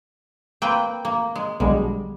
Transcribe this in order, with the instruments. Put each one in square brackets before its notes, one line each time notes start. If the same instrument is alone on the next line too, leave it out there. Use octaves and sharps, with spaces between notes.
[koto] A#3 C4 B4 [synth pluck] G5
[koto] A#3
G#3
[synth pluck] B1 D3 G#3 [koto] G3